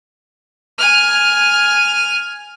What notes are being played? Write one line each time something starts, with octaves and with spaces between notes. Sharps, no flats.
G#5 F6